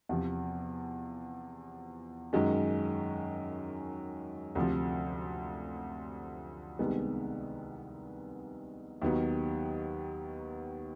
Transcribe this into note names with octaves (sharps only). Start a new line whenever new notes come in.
E2 C3 F3
F#2 D#3 G#3 C#4
D2 C3 F3
C2 C3 D#3 G#3 B3
D#2 D#3 F#3 B3